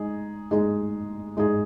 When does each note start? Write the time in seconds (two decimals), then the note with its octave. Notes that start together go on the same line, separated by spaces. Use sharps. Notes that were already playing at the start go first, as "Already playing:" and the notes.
Already playing: G#3 D#4 G#4
0.51 G#3 D#4 G#4
1.37 G#3 D#4 G#4